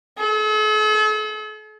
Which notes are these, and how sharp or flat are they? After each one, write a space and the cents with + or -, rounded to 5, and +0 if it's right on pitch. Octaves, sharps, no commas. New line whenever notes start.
A4 -45